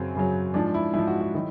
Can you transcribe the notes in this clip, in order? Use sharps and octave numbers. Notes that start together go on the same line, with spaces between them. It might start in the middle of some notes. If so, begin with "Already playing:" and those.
Already playing: F#2 C#3 F#3 C4
F#2 C#3 F#3
G#2 F3 D4
E4
G#2 F3 E4
F#4
F#4
D#3 F#3 E4